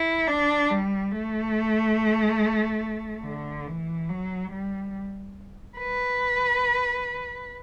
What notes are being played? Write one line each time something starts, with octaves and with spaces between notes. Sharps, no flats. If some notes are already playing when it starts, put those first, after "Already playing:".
Already playing: E4
D4
G3
A3
D3
E3
F#3
G3
B4